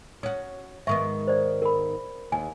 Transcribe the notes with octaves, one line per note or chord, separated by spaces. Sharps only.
C#4 F#4 D#6
G#2 D#3 B3 E5 C#6
C5 D5
A#4 B5
D#2 G#5